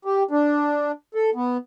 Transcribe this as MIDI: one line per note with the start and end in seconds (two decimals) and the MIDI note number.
0.05 0.23 67
0.31 0.92 62
1.15 1.30 69
1.35 1.57 59